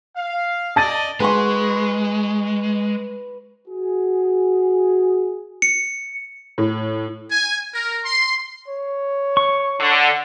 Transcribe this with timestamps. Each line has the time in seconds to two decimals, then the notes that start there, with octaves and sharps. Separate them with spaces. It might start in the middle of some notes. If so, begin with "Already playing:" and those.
0.16 F5
0.76 D5 D#5 A5 A6 D#7
1.20 G#3 B4 C6 C#6
3.68 F#4 G#4
5.62 C#7
6.58 A2
7.31 G#5
7.74 A#4
8.06 C6
8.68 C#5
9.37 C#6
9.80 D3